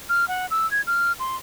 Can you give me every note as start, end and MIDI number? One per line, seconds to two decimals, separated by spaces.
0.09 0.28 89
0.28 0.46 78
0.51 0.69 88
0.71 0.81 92
0.87 1.12 89
1.20 1.37 84